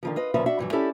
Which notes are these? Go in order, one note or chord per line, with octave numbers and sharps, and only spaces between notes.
D3 D#3 F3
F4 B4 D#5
D#2 A#2 C#3 F3 B4 E5
D4 F#4 E5
G2 E3 F#3
C#4 E4 G4 A4 D5